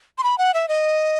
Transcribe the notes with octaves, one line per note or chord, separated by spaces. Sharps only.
C6
B5
F#5
E5
D#5